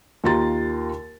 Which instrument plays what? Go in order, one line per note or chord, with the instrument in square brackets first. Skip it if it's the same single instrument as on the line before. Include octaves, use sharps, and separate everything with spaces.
[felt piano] D#2 F4 G4 A#5 C6 A6